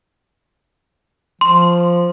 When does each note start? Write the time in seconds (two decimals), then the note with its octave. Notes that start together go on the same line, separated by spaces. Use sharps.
1.41 F3 C6